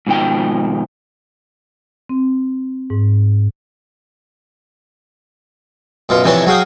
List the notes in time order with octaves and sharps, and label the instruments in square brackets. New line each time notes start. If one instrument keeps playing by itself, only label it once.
[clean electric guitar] G#2 B2 D#3 F3 G5
[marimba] C4
G#2
[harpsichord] F#2 B2 F4
F2 C3 E3 D4 C#5 A5
F#3 F#4 G#4 F5 G5 D#6